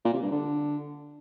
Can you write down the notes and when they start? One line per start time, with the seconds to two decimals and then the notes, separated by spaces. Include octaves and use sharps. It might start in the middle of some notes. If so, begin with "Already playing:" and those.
0.05 A#2
0.13 C3
0.22 G2
0.31 D3